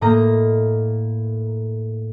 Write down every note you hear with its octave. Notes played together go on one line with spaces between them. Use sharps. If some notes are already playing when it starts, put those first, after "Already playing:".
A2 A#3 D#5 A#5 A#6